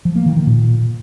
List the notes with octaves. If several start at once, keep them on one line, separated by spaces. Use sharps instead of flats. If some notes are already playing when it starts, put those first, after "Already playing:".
F3
A#3
D#3
D#3
A#2